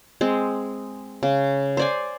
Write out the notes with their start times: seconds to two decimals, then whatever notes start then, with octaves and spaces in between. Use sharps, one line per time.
0.21 G#3 C4
1.23 C#3
1.77 C5 D5 G#5